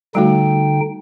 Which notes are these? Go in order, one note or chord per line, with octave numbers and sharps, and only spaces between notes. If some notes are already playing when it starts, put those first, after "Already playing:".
D3 G3 A3 D#4 F#4 G5